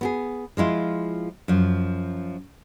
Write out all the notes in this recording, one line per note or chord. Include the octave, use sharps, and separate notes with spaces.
B3 G4 G#4
F3 G#3 E4 F4
F#2 F3